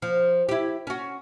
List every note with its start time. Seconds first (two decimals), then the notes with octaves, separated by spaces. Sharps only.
0.02 F3
0.49 E4 G4
0.87 C#4 F#4